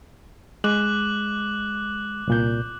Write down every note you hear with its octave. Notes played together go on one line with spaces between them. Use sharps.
G#3 D6 F#6 F#7
C2 A#2 G6